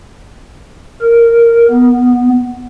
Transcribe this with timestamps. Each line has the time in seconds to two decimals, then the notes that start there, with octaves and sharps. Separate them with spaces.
1.02 A#4
1.71 B3